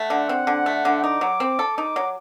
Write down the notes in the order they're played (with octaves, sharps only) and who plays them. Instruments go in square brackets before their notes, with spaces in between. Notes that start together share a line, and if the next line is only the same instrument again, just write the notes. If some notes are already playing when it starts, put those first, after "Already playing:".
Already playing: [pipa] A3 [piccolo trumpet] F#5
[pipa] D3
C4
D3
A3
D3
[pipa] D#4 [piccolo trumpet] D6
[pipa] F#3
C4
A4
[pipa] D#4 [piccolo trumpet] D6
[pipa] F#3